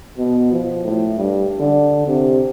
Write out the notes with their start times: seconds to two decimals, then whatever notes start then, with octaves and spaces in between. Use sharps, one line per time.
0.18 B2
0.52 F3
0.85 A2
1.17 G2
1.60 D3
2.07 C3